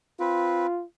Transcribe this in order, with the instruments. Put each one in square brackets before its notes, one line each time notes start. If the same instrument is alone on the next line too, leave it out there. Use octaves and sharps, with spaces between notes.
[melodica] C4 B4 [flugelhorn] F4